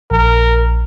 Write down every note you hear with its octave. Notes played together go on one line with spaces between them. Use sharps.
A#1 A#4